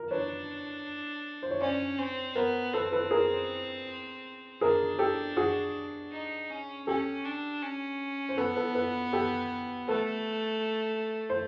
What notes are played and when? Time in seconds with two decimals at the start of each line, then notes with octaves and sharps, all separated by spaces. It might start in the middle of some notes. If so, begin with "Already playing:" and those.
Already playing: A#4
0.11 D4 B4 C#5
1.43 C5
1.51 C#5
1.61 C#4 C5 D5
1.99 C4
2.35 B3 A#4 C5
2.73 C4 A4 B4
2.92 A4 B4
3.11 G#4 A#4
4.61 D4 G#4 A#4
4.99 G4 A4
5.37 F#4 G#4
6.12 D#4
6.50 C#4
6.87 C#4 G4 A4
7.24 D4
7.62 C#4
8.29 C5
8.37 B3 A4 B4
8.56 A4 B4
8.75 A4 B4
9.13 G4 A4
9.88 A3 A4 B4
11.30 C5